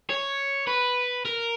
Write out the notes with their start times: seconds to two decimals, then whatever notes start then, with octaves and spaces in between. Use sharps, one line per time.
0.10 C#5
0.67 B4
1.25 A#4